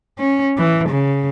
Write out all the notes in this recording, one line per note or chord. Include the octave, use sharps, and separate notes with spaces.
C#4
E3
C#3